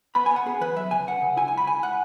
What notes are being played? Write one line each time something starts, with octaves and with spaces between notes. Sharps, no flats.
B3 B5
G#5
B3
F#5
B3 G#4
E3 B4
F#3 E5
C#3 G#5
C#3 F#5
C#3
E4 G#5
G#5
C#2
B5
C#2 G#5
F#5